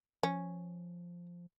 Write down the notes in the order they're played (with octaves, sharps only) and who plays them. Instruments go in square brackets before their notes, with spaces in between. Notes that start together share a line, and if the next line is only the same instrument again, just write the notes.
[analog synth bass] F3 [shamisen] C#4